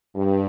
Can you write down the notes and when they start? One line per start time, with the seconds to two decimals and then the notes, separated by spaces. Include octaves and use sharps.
0.15 G2